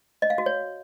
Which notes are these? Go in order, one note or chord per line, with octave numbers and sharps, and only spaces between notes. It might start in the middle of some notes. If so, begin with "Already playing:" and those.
D#5
F5
F#4
C#5